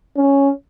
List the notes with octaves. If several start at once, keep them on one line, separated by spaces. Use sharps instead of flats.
C#4